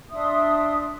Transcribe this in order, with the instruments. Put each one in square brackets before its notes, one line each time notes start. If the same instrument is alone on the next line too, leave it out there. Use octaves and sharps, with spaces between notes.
[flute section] D4 E5 C6 D#6